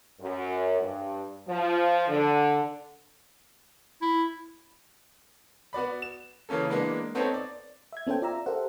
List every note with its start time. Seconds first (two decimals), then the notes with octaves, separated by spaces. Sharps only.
0.20 F#2
0.80 G2
1.47 F3
2.08 D3
4.02 E4
5.73 B3 F#4 D5 B5
6.02 E7
6.49 C#3 E3 A#3 C#4 A4
6.70 E3 G#3 A#3 B3 D4
7.15 B3 C4 D#4 A4 C#5
7.34 D5
7.93 E5 G#6
8.07 B3 C#4 A4 C5 G5
8.22 F4 D5 E5 A#5 E6
8.46 G4 A4 A#4 C5 E5 F#5